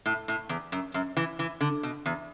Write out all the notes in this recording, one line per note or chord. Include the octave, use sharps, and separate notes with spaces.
A2
A2
E2
F#2
F#2
E3
E3
D3
B2
E2